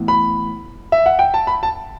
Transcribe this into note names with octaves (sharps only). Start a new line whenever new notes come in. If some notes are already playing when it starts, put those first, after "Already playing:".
Already playing: A2 E3 B3
B5
E5
F#5
G5
A5
B5
A5